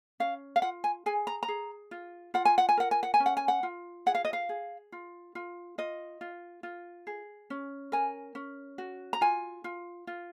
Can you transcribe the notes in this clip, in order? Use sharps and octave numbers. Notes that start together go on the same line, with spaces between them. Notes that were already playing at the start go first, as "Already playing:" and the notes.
C#4 F5
F5
F4 F#5
G#5
G#4 G#5
A#5
A#5
G#4
F4
F4 F#5
G#5
F#5
G#5
A#4 F#5
G#5
F#5
G#5
C#4
F#5
G#5
F#5
F4
G#4 F#5
F5
D#5
F5
G#4
F4
F4
F4 D#5
F4
F4
G#4
C#4
A#4 G#5
C#4
F#4
A#5
F4 G#5
F4
F4